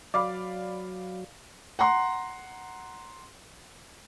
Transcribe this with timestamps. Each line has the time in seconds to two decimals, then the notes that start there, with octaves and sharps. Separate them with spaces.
0.14 F#3 D5 F5 B5 D6
1.79 F#5 A#5 C6